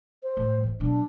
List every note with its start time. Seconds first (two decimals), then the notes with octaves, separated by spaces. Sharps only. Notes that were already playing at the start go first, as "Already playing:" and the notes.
0.23 C5
0.37 A2
0.64 G#2 E3
0.80 B2 F#3 D4